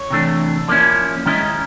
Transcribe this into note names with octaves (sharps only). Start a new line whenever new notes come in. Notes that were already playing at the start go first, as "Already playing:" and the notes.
Already playing: C#5
C3 E3 A3 D4
F3 A#3 C#4 E4 D5
D#3 G#3 C#4 E4 D#5